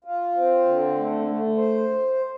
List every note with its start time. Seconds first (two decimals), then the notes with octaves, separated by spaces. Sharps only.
0.04 F4
0.35 C4
0.65 D3
0.96 A3
1.27 A3
1.57 C5